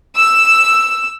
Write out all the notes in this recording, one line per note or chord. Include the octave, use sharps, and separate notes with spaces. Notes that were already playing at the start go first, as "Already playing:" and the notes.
E6